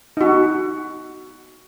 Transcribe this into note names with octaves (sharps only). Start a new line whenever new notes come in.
D#4 F#4